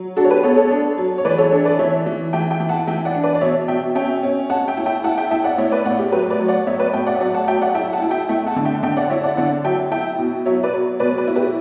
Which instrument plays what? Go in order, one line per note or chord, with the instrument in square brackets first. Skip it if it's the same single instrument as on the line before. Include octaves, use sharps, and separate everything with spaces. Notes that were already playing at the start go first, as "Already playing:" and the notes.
Already playing: [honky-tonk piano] F#3
D4 F#4 A4
C#5
G4 B4
B3 A4 C#5
A4 C#5
D4
F#3
C#5
E3 B4 D5
A4 C#5
D4 A4 C#5
B4 D5
E3 C#5 E5
E3
E3 E5 G5
E5 G5
E3
F#5 A5
E3 E5 G5
D5 F#5
D4
B4 D5
D5
B2 C#5 E5
B2 E5 G5
C#4 E5 G5
C#4
C#4 F#5 A5
E5 G5
E4
E5 G5
E4 F#5 A5
E5 G5
E4 E5 G5
D5 F#5
A2 C#5 E5
B4 D5
A2 D5 F#5
G4
F#3 G4 B4
B4 D5
F#3
D5 F#5
A2 C#5 E5
B4 D5
A2 E5 G5
D5 F#5
E5
F#3 D5 F#5
F#5 A5
F#3 E5 G5
D5 F#5
E4 E5 G5
F#5 A5
E4
E5 G5
A3 E5 G5
F#5 A5
D3
E5 G5
D3 E5 G5
D5 F#5
E4 C#5 E5
D5 F#5
D3 D5 F#5
F#3 E5 G5
E4 E5 G5
B2
F#3 C#5 E5
B4 D5
F#3
B2 B4 D5
B4 D5
E4
G4 B4